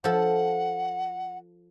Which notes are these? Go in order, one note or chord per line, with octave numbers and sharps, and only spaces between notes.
F3 A4 F#5